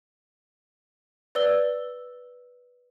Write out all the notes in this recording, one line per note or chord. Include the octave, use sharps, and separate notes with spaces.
B4 D5 E6 G7